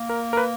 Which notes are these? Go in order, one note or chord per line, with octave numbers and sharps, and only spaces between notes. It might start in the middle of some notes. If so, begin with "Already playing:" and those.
Already playing: A#3
A#4
A#4
B4